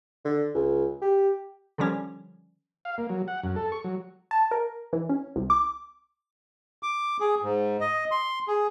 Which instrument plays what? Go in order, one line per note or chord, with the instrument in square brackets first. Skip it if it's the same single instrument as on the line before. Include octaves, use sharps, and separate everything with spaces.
[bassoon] D3
C#2
G4
[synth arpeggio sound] D3 D#3 F3 G3 C#4
[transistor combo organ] F5
A#3
F#3
F#5
F#2
A4
C#6
F#3
[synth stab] A5
A#4
E3
C#4
C2
D6
[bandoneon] D6
G#4
G#2
D#5
C6
G#4